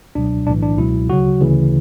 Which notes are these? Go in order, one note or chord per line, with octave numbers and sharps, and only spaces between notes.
C#2 B2 F#3 D4
B1 A2 E3 D4
D4
C#2 B2 F#3 E4
D2 C#3 F#3 F#4
D2 C#3 E3